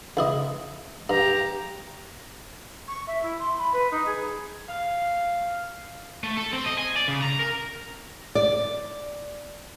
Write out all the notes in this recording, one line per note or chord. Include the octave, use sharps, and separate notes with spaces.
C#2 E4 D#5
G2 G4 A#5
C#6
E5
E4
C6
B5
B4
D#4
G#4
F5
A3
A4
C4
D#5
G#5
D5
C#3
A#5
A#4
D5